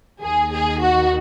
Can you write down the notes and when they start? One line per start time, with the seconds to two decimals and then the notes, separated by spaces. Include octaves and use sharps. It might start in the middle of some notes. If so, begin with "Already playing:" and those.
0.22 D#2 D#3 G#4
0.51 G#4
0.81 F#4